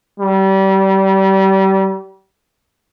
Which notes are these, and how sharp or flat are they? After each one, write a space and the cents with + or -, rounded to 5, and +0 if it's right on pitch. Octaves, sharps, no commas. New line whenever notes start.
G3 -30